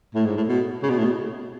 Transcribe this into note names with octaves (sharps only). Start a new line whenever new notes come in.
A2
G#2
A2
B2
C#3
B2
A2
B2